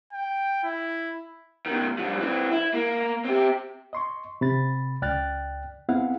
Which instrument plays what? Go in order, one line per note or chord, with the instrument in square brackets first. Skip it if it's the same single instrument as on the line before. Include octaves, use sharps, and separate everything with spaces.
[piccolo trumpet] G5
E4
[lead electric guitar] B2 D#3
G2 F3
E3 C4
E4
A#3
C4 G4
[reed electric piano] D#5 C6 C#6
C3 B5 A6
C#2 D5 G5 F6 F#6 A6
B3 C4 E4 G#4 F5 F#5